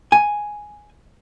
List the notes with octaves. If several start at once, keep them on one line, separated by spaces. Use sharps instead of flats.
G#5